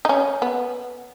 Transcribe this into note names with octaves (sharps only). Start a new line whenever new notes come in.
D#4
C#4
B3